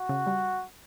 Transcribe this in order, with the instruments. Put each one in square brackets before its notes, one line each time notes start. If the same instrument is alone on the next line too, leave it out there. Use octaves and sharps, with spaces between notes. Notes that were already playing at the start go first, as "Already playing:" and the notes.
Already playing: [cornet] F#4
[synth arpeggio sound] C#3
G3